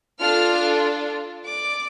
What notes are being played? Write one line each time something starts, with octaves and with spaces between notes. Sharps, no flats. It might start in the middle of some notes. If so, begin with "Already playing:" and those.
D4 F4 A4 F5 F6
D5 D6